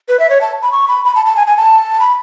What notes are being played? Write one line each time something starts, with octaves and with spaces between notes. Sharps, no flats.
B4
E5
C#5
A5
B5
C#6
B5
B5
A5
A5
G#5
G#5
A5
B5